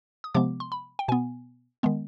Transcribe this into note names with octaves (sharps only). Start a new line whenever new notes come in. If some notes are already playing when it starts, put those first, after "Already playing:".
D#6
C3 F3 G#3 B3 D6
C6
B5
G5
B2 B3 G#5
D#3 G#3 B3